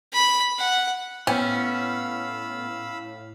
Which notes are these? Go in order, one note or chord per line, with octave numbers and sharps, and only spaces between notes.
B5
F#5
A2 B3 C#4 F5 G5 B5 E6